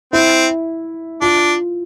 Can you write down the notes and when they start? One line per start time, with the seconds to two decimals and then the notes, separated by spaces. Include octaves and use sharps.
0.13 C4 E4
1.21 D4 F4